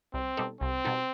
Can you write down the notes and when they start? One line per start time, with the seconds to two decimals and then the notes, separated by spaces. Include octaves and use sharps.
0.14 C2 C4
0.37 B2 G3 D#4 A4
0.61 C2 C4
0.85 B2 G3 D#4 A4